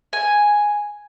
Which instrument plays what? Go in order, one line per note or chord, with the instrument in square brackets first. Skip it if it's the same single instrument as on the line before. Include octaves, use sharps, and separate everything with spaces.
[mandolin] G#5